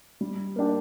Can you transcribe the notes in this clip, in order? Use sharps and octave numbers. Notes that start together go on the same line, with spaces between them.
G3
A#3 D4 G4